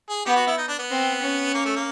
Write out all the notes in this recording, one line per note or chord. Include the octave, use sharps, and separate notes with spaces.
G#4
B3 G4
F#4
E4
D#4
D4
B3
C4
C#4
A#3
A3
A#3